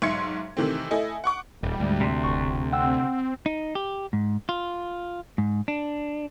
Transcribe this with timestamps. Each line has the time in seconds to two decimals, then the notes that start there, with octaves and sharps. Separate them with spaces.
0.02 B1 G#2 E5 C6 G#6 C#7
0.57 C3 D#3 E3 A3 C4
0.91 A3 E4 A4 D#5 G#5
1.24 F#5 C#6 D6
1.63 D#1 E2 G3
1.80 D2 G#2 G#3
2.01 C3
2.24 E1 C#6
2.73 C4 F#5 G5 E6
3.46 D#4
3.75 G4
4.13 G#2
4.49 F4
5.38 G#2
5.68 D4